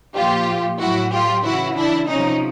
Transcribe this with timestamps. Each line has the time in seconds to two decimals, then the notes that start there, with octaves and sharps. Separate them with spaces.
0.16 A#2 F3 F4 G4
0.80 A2 F#3 E4 F#4
1.12 F4 G4
1.44 C#3 E3 E4 F#4
1.76 D4 E4
2.09 C3 F3 C#4 D#4